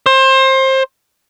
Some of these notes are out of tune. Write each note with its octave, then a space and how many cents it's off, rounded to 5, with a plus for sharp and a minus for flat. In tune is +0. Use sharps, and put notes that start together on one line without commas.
C5 +25